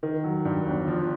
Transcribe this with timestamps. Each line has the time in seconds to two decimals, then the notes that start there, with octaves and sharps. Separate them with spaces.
0.03 D#3
0.24 F#3
0.45 G2
0.66 G1
0.88 F3